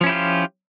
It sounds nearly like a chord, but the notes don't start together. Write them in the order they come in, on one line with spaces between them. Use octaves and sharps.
F3 C#4 E4 G4 F4